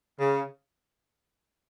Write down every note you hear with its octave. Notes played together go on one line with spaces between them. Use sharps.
C#3